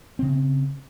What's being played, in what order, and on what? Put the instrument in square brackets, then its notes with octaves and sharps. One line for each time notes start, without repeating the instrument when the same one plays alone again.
[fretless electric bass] C#3 C4